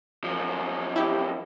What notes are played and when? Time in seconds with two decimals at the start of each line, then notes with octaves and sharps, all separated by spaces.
0.24 F#2 F3
0.96 E4 G4